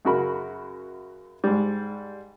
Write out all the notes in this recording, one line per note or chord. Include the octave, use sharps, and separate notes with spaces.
F#2 C#3 F#4 A#4 B5
G#2 G3